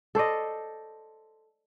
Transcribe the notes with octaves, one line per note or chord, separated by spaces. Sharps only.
A4 C5 D5 D#5